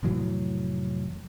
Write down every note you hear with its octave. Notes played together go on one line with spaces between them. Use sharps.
F1 A2 E3 F#3